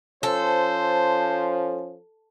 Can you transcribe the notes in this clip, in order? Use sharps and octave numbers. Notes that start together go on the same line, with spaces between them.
F3 C#4 A4 C5